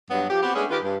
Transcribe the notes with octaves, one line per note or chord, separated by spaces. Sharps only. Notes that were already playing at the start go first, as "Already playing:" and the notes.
G2 F#3 B3
F3 G4
B3 C4 F#4 G4
G#3 A3 B3 C#4 D4 G#4
D#3 F4 G4 A#4 B4
G2